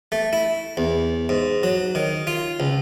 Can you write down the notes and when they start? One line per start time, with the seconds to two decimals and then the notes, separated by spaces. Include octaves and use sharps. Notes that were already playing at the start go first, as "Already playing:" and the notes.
0.12 A3
0.33 E4
0.77 E2
1.29 G#2
1.63 F#3
1.95 D#3
2.27 F4
2.60 C#2